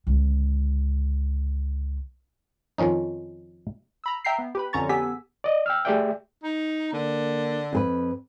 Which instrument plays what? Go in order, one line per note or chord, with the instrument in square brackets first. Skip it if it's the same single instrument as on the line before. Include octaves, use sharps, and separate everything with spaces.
[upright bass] C#2 D3
[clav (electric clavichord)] F2 D#3 F3 C#4 D#4
[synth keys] A#5 B5 E6
E5 G5 A#5 G6 B6 C7
B3
G4 B4 B5
F2 D3 C#4 A#5 C#6 A6
B3 G4 A4 G#5 E6 B6
[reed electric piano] D5 D#5
G5 E6 F6
A3 G4 G#4 D5 E5 G5
[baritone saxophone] D#4
[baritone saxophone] D3 [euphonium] A#3
[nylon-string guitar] F2 G#4 B4 [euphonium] C4